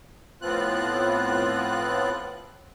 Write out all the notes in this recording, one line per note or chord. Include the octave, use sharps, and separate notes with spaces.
A2 F3 B3 C4 F4 F#6